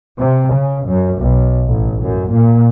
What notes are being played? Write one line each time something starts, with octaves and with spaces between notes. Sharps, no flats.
C3
C#3
F#2
B1
A1
F#2
A#2